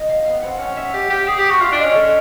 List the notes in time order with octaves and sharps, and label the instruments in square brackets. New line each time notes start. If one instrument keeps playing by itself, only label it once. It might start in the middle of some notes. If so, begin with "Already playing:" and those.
Already playing: [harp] D#5
F5
[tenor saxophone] B3 [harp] F5
[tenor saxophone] C4 [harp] F#5
[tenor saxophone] C#4 [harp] F#5
[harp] E5
[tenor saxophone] G4
G4
G#4
G4
F#4
[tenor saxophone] F4 [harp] E5
[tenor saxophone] D4
[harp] D#5
[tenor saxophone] C#4
[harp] A4